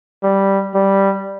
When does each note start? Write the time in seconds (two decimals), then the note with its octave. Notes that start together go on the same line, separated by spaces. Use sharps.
0.23 G3
0.75 G3